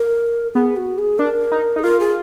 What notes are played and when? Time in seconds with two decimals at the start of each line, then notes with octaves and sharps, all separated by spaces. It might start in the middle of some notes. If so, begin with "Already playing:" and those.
Already playing: A#4
0.54 B3 G#4
0.77 F#4
0.98 G#4
1.19 D4 A#4
1.52 D#4
1.76 D#4
1.79 G#4
1.83 F4 A#4
2.00 G#4